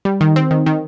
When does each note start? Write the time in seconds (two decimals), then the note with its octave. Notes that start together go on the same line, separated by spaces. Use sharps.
0.05 G3
0.21 D#3
0.36 C4
0.51 D#3
0.66 D#3